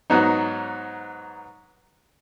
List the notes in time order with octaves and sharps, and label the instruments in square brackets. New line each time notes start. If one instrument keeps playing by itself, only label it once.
[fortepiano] G#2 F#3 B3 D#4